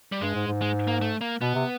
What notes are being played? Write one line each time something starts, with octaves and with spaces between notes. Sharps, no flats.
G3
G2 G#3
G#2
G#2
G#3
A#3
A3
A#3
B2 B3
C3